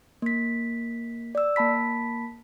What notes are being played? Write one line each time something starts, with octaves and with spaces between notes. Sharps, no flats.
A#3 B6
D5 E6
A#3 A5 B5 B6